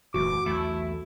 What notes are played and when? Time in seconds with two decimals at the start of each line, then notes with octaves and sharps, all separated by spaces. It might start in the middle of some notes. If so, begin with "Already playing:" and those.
0.14 D#1 F#2 E3 A3 F#4 D6
0.46 B1 E2 E3 A3 E4